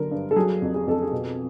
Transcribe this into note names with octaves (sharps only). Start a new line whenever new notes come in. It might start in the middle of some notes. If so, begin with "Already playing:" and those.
Already playing: D3 F#3 A#4
G2
A4
F#3 G#4
F2
G#4
F2 A4
G#4
B2